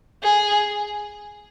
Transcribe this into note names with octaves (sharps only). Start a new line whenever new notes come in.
G#4